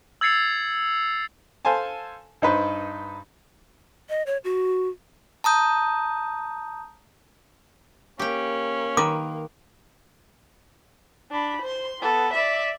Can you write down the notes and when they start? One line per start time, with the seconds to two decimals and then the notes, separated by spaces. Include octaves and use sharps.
0.21 E6 G#6 A6 C7 C#7 F7
1.65 A4 C5 F5 G#5 A5
2.42 G2 D#4 B4 C5
4.09 D#5
4.26 C#5
4.44 F#4
5.44 A5 A#5 D#6 G6
8.19 A#3 C#4 G4 G5
8.97 D#3 B4 D6
11.31 D4 B5
11.62 C5 C6
12.01 B3 A4
12.33 D5 E5